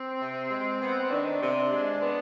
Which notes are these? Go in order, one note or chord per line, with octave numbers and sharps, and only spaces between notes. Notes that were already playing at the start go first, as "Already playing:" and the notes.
Already playing: C4
C3
G#3
B3
C4
D#3 D4
C3
G#3
B3